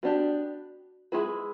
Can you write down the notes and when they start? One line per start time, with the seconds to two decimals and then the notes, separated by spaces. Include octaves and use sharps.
0.03 B3 D4 F#4 G4
1.12 G#3 B3 E4 F4 G#4 B4